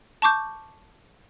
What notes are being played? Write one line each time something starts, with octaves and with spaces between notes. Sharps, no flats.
A5 C#6 D6 G6